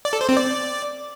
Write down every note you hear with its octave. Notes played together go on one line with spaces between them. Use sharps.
D5
A4
C5
C4
D5